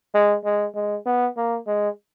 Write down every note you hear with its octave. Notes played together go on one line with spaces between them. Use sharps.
G#3
G#3
G#3
B3
A#3
G#3